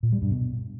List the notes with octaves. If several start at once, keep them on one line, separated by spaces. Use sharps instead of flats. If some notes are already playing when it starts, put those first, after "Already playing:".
A#2
G3
G2
B2